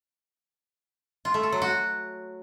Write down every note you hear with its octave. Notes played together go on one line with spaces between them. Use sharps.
F4
A3
A4
F#3
F#4